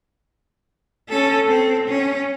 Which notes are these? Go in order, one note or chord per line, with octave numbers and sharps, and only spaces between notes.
C#4 A4
C4
C#4